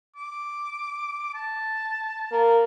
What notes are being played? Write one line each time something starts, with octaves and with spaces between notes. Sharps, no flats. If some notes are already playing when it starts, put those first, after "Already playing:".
D6
A5
A#3